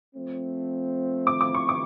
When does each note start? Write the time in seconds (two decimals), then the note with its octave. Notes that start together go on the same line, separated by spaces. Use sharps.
0.15 F3 A3 C4
1.27 D6
1.41 D6
1.55 C#6
1.69 D6